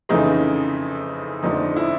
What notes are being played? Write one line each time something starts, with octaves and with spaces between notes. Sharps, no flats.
F2 C#3 E3 A3 D#4
F2 D3 F3 A3 D#4
E4